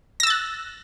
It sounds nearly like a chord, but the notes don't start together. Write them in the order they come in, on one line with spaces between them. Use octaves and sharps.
A#6 E6 A6 F#6